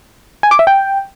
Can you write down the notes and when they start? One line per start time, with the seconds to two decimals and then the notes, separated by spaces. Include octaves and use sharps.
0.43 G#5
0.51 D6
0.59 E5
0.67 G5